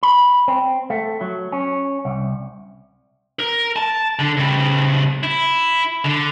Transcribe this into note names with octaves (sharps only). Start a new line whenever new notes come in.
B5
C4
A3
F#3
C#4
C2
A#4
A5
D3
C#3 G3
E4
D3